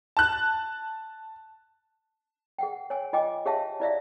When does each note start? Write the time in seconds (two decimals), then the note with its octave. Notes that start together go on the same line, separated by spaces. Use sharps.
0.17 A5 F#6
2.59 G#4 F#5 G5
2.90 C#5 G#5
3.13 F4 D#5 G5 G#5 D6
3.46 G4 G#4 C#5 E5 F5 A5
3.80 E4 D5 E5 F5